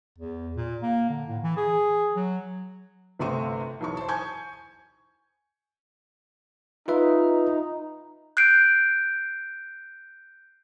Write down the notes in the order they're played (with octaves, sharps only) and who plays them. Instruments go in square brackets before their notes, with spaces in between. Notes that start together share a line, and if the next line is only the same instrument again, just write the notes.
[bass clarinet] E2
A#2
A#3
D3
A2
E3
G#4
F#3
[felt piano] G1 C3 A3 C4 C#6 D#7
B1 E3 C#6
C5 A5
G#5 C#6 G6 G#6
[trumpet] D#4 [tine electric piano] F4 B4 E5
[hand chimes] F#6 G6 C7 D7